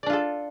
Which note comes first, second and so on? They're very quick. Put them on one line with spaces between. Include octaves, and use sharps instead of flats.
D5 D4 F4 A4